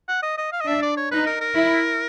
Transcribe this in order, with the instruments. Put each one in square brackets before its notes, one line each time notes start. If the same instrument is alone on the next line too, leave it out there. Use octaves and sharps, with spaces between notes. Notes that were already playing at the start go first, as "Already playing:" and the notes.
[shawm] F#5
D#5
D#5
F5
D#5
[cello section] D4 [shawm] E5
[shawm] D5
C#5
[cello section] D#4 [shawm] B4
[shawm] A#4
A#4
[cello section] E4